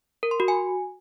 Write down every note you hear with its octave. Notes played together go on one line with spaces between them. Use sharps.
A#4
C6
F#4
G#5